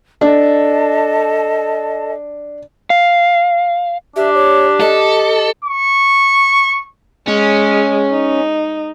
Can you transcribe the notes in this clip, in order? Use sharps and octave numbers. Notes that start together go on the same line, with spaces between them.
D4 A4 D#5 A5
F5
D4 G4 E5
C#5
A4 D#5
C#6
G#3 C#4
D#4